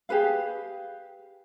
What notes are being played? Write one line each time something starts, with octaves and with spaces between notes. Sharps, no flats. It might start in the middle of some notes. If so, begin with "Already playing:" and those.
G4 G#4 B4 F5